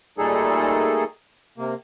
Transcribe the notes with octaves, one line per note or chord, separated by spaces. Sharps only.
A#2 G3 A3 D#4 G#4 A4
C3 A#3